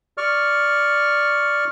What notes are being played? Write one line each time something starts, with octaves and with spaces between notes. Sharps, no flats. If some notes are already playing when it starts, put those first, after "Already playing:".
D5 C#6 F6